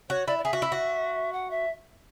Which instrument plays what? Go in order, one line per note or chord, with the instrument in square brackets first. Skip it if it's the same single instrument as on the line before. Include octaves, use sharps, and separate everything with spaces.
[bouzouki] F#4 [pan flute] C#5
[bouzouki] E4 [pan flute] D5
[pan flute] D5
[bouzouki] G#4 [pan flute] E5
[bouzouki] F#4
E4
F#4
[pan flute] F#5
E5